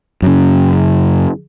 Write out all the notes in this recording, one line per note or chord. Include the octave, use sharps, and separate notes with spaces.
F#2 C#3